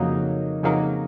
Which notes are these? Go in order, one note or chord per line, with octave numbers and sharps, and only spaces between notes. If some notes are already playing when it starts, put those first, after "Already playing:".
Already playing: F2 C#3 F#3 A#3 D#4
F2 C#3 F#3 A#3 D#4